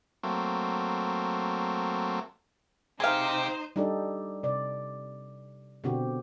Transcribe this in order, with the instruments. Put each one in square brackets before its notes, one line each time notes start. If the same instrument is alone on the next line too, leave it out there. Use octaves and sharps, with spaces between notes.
[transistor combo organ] F#3 A3 A#3 C4
[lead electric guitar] C4 G4 [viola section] D#4 C5 [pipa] G#4 F5
[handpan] G3 D4 D#4 G4 A4 D5
C3 D5
B2 D3 C4 F#4 G4